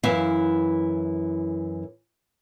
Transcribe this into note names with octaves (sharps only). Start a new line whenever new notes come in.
F#2 E3 E4 E5 F5